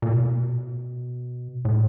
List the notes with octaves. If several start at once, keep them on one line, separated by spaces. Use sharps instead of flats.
A#2
B2
A2